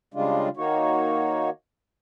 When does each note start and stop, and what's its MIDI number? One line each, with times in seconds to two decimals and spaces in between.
0.14 0.49 49
0.14 0.49 55
0.14 0.49 56
0.14 0.49 62
0.14 0.49 65
0.57 1.50 51
0.57 1.50 58
0.57 1.50 63
0.57 1.50 66
0.57 1.50 73